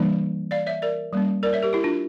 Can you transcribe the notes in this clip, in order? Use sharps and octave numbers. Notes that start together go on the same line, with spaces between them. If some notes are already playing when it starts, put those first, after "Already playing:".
Already playing: E3 G3 A#3 D4
D5 F5
C#5 E5
A#4 D5
G3 A#3 C#4
A#4 D5
C#5 E5
G4 A#4
E4 G4
D4 F4